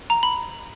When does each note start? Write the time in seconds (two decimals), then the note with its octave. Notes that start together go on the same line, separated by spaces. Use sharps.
0.10 A#5
0.23 B5